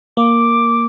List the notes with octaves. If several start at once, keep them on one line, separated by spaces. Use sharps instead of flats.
A#3 D6